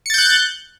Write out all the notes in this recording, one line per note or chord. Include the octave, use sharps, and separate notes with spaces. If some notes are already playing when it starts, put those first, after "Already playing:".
F#6 G6 A6 C#7